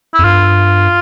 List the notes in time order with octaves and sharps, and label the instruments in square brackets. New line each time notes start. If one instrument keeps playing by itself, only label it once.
[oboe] E4
[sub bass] F2
[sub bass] G2 [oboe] F4